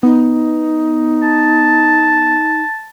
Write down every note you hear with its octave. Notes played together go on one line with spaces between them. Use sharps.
B3 D#4
A5